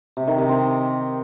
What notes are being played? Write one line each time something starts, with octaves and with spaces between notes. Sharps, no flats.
C3
D#3
C3
C4